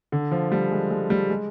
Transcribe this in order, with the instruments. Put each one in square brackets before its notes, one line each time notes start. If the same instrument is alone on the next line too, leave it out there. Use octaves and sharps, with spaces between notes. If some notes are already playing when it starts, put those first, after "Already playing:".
[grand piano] D3
F3
G3
G#3
G#3
G3
G#3